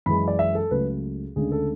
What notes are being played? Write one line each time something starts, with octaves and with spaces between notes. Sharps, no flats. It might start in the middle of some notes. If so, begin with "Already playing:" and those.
F#2 E3 G#3 B5
D5
E5
A4
C#2 C#3 F#3 A3 B4
D2 C#3 G#3 D4 G#4
A4